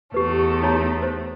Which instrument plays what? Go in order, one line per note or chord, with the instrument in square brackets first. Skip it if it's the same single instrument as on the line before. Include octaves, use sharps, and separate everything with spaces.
[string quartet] E2 A3 [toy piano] G4 B4
[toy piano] D#4 C#5 A#5
C5